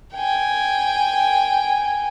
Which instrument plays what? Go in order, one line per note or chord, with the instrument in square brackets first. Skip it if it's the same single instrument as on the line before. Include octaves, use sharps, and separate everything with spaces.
[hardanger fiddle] G5 G#5